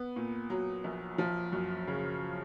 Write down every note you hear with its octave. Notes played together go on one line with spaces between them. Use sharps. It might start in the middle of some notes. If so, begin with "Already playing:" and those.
Already playing: B3
A#2
F#3
A#1
F3
F#2
C#3